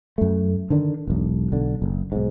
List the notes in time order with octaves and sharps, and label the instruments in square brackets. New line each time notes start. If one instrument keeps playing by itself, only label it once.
[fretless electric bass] F#2 A3
D3 D#3 D4
E1 B1
B1 D3
F#1
B1 G#2